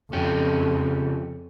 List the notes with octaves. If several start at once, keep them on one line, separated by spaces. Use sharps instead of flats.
F2 C#3 F3 C#4 G4